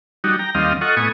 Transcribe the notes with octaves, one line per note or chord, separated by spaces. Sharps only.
G3 D#4 F#4
G5 A#5
D#2 G3 C4 D#5 F5
F4 A4 D#5 F#5 C#6
A2 B3 G#5 C#6 D#6